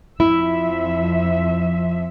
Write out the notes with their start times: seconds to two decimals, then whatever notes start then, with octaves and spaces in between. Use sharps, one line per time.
0.20 F2 F3 E4 E5